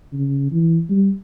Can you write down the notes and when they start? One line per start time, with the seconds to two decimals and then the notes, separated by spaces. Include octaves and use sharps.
0.13 C#3
0.52 E3
0.90 G3